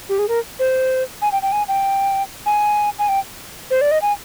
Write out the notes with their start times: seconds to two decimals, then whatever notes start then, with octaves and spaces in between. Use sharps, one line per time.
0.09 G4
0.19 G#4
0.28 A#4
0.59 C5
1.22 G#5
1.32 G5
1.42 G5
1.52 G#5
1.68 G5
2.46 G#5
2.99 G#5
3.09 G5
3.71 C5
3.81 D5
3.91 D#5
4.02 G#5